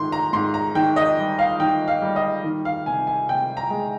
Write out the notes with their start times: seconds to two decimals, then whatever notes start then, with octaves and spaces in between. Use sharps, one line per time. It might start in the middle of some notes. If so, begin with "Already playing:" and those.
Already playing: G#2 D#3 C6
0.12 A#5
0.33 G#2 C6
0.54 A#5
0.75 D#3 G5
0.96 D#5
1.18 G3
1.39 F5
1.60 D#3 G5
1.88 F5
2.02 G3
2.16 D#5
2.44 D#3
2.65 F5
2.86 C3 G#5
3.07 G#5
3.29 C3 G5
3.57 A#5
3.70 G#3